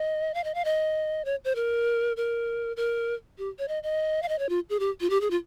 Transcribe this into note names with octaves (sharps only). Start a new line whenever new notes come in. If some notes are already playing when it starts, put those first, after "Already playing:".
Already playing: D#5
F5
D#5
F5
D#5
C#5
C5
A#4
A#4
A#4
G4
C#5
D#5
D#5
F5
D#5
C#5
F4
G#4
G4
F4
G4
G#4
F4